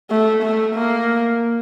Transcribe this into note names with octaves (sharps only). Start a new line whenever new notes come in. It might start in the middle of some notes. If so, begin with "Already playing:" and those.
A3
A3
A#3